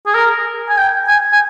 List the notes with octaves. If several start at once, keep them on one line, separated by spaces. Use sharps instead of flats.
G#4
A#4
G#5
G5
G#5
G#5